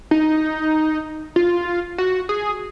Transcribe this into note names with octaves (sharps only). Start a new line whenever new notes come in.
D#4
F4
F#4
G#4